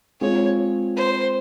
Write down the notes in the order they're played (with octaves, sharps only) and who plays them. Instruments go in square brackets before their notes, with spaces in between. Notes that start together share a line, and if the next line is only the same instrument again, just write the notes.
[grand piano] G#3 C4 F4 G#4 [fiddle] C#5
[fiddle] C5